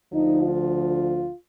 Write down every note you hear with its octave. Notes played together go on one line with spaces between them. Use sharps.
D2 D3 F3 D#4
F4